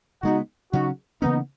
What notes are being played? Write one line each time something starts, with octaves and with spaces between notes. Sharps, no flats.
C#3 G#3 B3 D#4 F#4
C#3 F#3 C#4 D#4 F#4
C#3 E3 A#3 B3 C#4 D#4